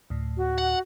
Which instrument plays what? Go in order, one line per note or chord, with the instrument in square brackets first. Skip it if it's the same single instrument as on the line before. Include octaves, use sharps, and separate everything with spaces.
[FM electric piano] D2 A2
[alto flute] F#4
[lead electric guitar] F#5